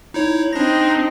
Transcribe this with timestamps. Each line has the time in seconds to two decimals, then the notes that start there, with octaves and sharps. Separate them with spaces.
0.14 D#4 E4 C#5
0.53 C4 D4 D#4 A#6